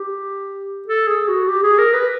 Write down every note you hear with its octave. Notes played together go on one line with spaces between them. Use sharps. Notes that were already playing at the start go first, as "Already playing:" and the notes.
Already playing: G4
A4
G#4
F#4
G4
G#4
A#4
B4